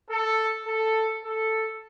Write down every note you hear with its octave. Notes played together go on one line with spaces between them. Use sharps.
A4
A4
A4